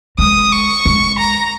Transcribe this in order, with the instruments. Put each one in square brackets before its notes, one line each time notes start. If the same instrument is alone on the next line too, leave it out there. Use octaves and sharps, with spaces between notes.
[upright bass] G#3 [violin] D#6
[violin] C#6
[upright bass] G#3
[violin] A#5